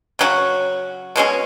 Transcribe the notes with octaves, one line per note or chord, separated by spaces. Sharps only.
C#3 F#3 C#4 F#4
B2 G#3 C#4 G#4